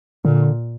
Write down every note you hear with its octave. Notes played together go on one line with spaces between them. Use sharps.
A#2 D3